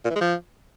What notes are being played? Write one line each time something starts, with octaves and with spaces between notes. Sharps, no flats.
A#2
E3
G#3
F3